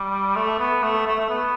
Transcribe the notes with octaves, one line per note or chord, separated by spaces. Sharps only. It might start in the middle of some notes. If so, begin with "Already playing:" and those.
Already playing: G3
A3
B3
A3
A3
A3
B3